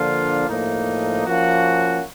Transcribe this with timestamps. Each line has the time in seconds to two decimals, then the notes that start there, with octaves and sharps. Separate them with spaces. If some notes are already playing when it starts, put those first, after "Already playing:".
Already playing: D3 F3 A#3 D4 F4
0.48 A2 F3 A#3 D#4
1.26 F3 A#3 C#4 F#4